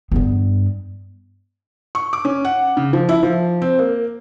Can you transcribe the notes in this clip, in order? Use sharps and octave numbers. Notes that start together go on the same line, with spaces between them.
G2 B3
C#6
D6
C#4
F#5
C#3
F3
E4
F3
C4
A#3